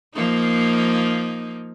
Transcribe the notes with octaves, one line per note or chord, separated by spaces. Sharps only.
F3 A#3 D#4